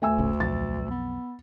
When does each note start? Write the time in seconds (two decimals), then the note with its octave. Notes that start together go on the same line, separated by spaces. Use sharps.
0.02 D2 A3 G#5 E6
0.18 D1 G#1 C#3
0.40 B1 F2 A6
0.91 B3